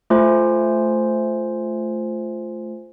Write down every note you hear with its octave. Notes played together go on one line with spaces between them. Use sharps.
A3 F4 C5 G#5